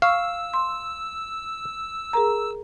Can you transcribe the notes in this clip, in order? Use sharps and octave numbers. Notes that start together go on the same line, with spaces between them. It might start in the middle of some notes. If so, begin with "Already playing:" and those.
F5 C#6 E6
C6
G#4 A#4 A#5